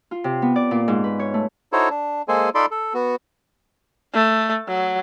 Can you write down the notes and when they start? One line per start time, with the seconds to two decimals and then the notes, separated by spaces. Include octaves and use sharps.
0.11 F4
0.24 C3
0.42 B3
0.56 D5
0.71 A#2
0.88 G#2
1.04 B4
1.19 C#5
1.34 A3
1.73 D#4 E4 F#4 A4 C5 C#5
1.90 D4
2.28 G#3 A#3 G#4 A4 C5 G#5
2.55 D#4 F4 A4 D5 B5 C6
2.71 A4
2.94 B3 F#4
4.13 A3
4.68 F#3